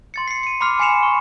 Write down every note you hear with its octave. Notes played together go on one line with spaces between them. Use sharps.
C6 A6 C#7
C7 C#7
C#7 D#7
B5 C6 D6 F6 C7 F7
G#5 B5 C7 C#7 E7 F7
C#6